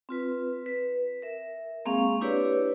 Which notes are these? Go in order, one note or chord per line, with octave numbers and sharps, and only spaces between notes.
C4 F4 B4
B4
A#4 E5
G#3 A#3 C4 G#4 F5 C#6
D4 E4 G4 B4 C#5 D5